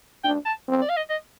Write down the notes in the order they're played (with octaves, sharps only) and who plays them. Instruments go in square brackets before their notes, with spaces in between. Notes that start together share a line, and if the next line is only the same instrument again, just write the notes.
[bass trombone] D4 [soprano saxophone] G5
[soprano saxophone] A5
[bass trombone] C4
[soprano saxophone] D5
F5
D#5
D#5